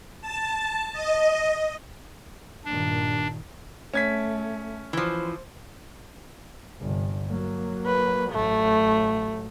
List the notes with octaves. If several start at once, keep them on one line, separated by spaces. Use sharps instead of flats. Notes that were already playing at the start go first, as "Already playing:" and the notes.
A5
D#5
G2 A#2 D#3 D4
A3 C#4 G#6 B6
E3 F3 C5
G1 C3
F#3 A#3
B4
A1 F#3 A3